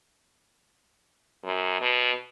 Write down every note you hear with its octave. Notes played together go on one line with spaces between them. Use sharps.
F#2
B2